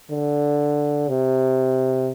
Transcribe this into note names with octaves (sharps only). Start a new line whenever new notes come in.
D3
C3